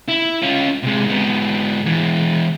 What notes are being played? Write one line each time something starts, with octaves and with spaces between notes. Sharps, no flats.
E4
C#4 F4
C3 G#3
G#2 B3
E3 G#3